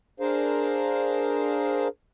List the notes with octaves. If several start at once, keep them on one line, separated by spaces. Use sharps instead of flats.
D4 G#4 A#4 C5 F5